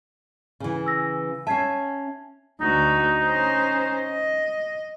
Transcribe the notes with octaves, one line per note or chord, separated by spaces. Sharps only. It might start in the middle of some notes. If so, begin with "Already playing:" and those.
C#3 E3
E6 A#6
C#4 E5 A5 G#6 C7
D2 D#4 F#4
C#4 C5
D#5